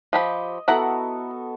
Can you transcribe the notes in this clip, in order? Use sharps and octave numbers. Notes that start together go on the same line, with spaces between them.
F3 G4 D#5 B5
B3 E4 F#4 A4 F#5 A#5